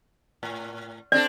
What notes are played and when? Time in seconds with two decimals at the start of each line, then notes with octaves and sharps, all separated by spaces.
0.43 A2
1.12 C4 D4 A4 D5